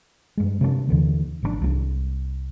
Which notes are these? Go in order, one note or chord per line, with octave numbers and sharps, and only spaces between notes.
G2 G#3
C3 A#3 B3 D4
D#2 D3 E3
G#1 D#3 D4
C2 G3 D4